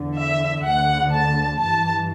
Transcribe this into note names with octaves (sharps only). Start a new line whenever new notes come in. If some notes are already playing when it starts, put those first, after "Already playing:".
Already playing: E2 D3
E5
D2 D3 F#5
A5
G2 E3 A5